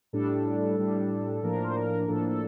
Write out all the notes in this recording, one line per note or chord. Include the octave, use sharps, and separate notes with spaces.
A2 G3 D4 A4
A2 G3 D4
A2 F3 A#3 D4 A#4
C5
A#4
A2 F3 A#3 D4 A4
A4